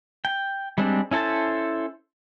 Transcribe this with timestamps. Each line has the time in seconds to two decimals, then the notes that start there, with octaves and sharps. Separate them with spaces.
0.25 G5
0.78 G3 G#3 C4 D4
1.11 C#4 E4 A4 C5 A5